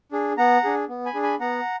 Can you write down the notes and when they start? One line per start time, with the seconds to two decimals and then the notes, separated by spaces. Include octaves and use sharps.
0.12 D4 G#4
0.38 B3 F#5 A#5
0.64 D4 G#4
0.89 B3
1.06 G#5 B5
1.14 D4 G#4
1.23 G#5 B5
1.40 B3 F#5 A#5